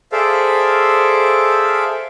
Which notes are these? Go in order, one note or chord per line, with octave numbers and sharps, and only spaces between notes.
G#4 A4 C5 D5 E5 F5